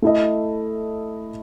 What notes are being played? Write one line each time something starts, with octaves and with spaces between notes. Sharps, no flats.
A3 E4 A4 D#5